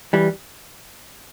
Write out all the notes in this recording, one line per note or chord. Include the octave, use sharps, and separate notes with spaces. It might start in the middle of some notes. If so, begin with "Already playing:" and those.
E3 G3